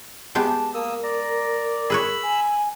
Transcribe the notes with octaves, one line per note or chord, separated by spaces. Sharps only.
G#3 B3 G4 A5
A#3 A#4 D#6 E6
D5 A#5
G#4 B4 C#5 B5 E6
G#5